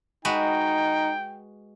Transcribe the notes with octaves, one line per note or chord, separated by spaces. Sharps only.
G#3 D#4 F#4 B4 G5